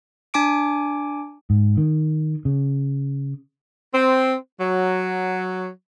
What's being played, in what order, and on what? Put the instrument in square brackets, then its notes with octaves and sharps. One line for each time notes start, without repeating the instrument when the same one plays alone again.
[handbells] D4 G#5 D6 D7
[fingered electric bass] G#2
D#3
C#3
[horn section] C4
F#3